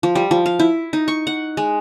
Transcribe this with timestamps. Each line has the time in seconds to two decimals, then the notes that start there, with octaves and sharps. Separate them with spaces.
0.03 F3
0.15 G3
0.31 F3
0.46 F5
0.59 E4
0.93 D#4
1.08 C#6
1.27 F#5
1.57 G#3